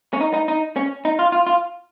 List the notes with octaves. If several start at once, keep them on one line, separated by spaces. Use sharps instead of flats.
C#4
D#4
D#4
D#4
C#4
D#4
F4
F4
F4